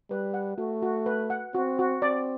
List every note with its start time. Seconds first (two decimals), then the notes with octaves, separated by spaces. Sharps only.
0.10 G3 B4
0.34 F#5
0.58 A3 F#4
0.82 F#4
1.06 B4
1.30 F#5
1.54 C4 F#4
1.79 F#4
2.02 C4 D5